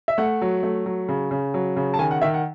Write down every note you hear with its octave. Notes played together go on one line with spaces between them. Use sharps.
E5
A3 F#5
F#3
A3
F#3
C#3
C#3
F#3
C#3
A5
D#3 G#5
F#5
D#3 E5
F#5